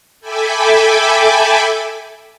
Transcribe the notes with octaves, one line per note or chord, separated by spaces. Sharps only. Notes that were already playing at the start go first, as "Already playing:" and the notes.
A4 E5 G5 G#5 B5 D6